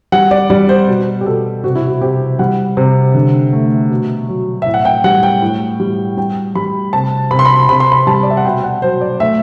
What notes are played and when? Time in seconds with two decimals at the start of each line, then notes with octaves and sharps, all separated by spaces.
0.12 G3 F#5
0.31 D5
0.50 G3 D5
0.69 C5
0.88 B2
1.21 G4
1.26 B2 A4
1.64 C3 F#4
1.75 E4
1.87 F#4
2.01 C3 G4
2.39 G3 F#5
2.77 C3
3.14 D3
3.53 A3
3.91 B2
4.28 F#3
4.62 A2 E5
4.74 F#5
4.85 G5
5.04 G3 F#5
5.23 G5
5.42 A2
5.80 G3
6.17 G3 G5
6.55 G3 B5
6.93 C3 A5
7.31 C3 B5
7.39 C6
7.45 B5
7.69 C3 B5
7.80 C6
7.92 B5
8.07 G3 A5
8.23 D5
8.30 E5
8.37 F#5
8.45 B2 G5
8.64 F#5
8.82 F#3 C5
9.01 D5
9.20 A3 E5